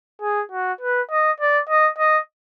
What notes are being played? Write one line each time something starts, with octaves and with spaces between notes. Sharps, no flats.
G#4
F#4
B4
D#5
D5
D#5
D#5